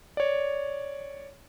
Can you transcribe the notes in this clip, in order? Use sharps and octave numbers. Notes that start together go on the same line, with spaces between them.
C#5 D5